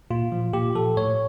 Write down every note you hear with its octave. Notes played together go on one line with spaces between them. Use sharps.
A#2 F4
F3
A#2 G4
F3 A4
A2 C#5